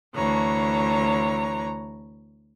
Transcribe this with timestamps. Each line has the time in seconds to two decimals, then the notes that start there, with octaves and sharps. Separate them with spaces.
0.14 D2 E3 C#5 A#5